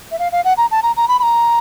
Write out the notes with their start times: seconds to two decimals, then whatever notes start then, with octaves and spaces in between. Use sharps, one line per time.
0.12 E5
0.19 F5
0.32 F5
0.45 F#5
0.57 A#5
0.71 A5
0.83 A#5
0.97 A#5
1.08 B5
1.19 B5
1.23 A#5